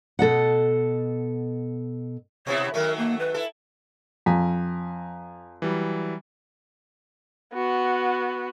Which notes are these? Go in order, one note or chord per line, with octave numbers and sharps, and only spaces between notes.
B2 A4 D#5 F#5
B2 B3 E4 C#5
D#3 F#3 A3 A#4
A#3
B4
E4 A4
F2 G#5 A#5 B6
E3 F#3 G3
B3 F#4